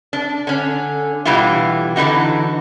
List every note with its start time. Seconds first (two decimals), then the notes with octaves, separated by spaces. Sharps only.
0.13 D4
0.47 D3 C#4
1.25 B2 E3 G3 D4 E4 F4
1.96 D3 E3 D#4 F#4